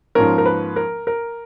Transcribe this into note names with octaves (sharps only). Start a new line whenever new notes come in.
G#2 F3 A#3 C#4 A#4
A#4
B4
A#4
A#4